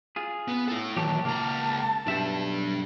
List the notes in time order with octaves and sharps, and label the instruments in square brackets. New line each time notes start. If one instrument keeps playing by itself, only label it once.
[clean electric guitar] F4 G#4
[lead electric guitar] B3
E4 A4
[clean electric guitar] A#2 F#3 G4 [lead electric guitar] D#3 E3 [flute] A5
[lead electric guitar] C#2 A#5 [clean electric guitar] A#3 [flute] A5
[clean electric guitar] B1 E5 [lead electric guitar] D4 G4